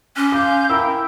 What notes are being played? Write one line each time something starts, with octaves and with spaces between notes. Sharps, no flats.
C#4 C6 D6 F#6
F5 C6 D6 G6
E4 A#4 G5 E6